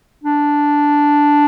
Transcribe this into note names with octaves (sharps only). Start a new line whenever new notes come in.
D4